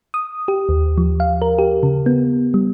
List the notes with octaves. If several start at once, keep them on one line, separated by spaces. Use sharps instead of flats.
D#6
G4
D#2
F3
F5
A#4
G4
C#3
B3
G3